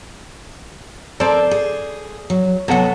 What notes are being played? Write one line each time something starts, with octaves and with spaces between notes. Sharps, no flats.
C4 A4 A#4 C5 D5
G#4
F#3
C3 F#3 B3 A4 F#5